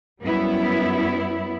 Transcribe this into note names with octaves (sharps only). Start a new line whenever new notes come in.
F#2 G3 B3 E4